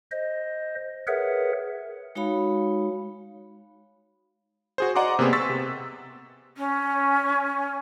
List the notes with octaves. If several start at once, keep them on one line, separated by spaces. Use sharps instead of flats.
C5 D#5
G#4 A#4 B4 C#5 E5 F#5
G#3 D#4 F#4 C#5 F5 B5
F#4 G#4 C5
D5 D#5 F#5 A#5 C6 D6
C3 A#3 B3 G#4 C5
C6 C#6 E6 A6 B6
C3
C#4